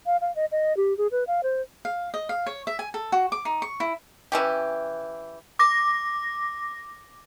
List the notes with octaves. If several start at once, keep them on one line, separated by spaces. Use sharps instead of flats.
F5
F5
D#5
D#5
G4
G#4
B4
F5
C5
F5
D#5
F5
C#5
E5
G#5
A4
F#4
D6
D#4
C#6
E4
E3 C#4 G4
D6 A#6